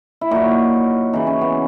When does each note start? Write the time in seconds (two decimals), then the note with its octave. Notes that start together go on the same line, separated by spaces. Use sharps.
0.21 E4
0.31 A#2 F#3 D#4
1.13 C#3 E3 D#4
1.27 C#4
1.41 B3